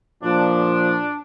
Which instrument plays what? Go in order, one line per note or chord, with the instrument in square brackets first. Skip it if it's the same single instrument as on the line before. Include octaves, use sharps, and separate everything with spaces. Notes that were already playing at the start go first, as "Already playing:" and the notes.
[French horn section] A#2 F3 [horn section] D4